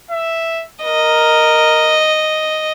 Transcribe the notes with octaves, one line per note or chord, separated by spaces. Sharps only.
E5
A#4 D#5